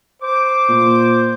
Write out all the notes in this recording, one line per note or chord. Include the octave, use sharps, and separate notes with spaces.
C5 D6
A#2